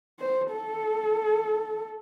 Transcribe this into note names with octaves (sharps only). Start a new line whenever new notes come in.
C5
A4